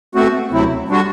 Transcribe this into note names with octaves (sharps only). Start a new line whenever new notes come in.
B2 A3 C4 F#4
D2 C3 F#3 C4 E4
D3 G3 D4 F#4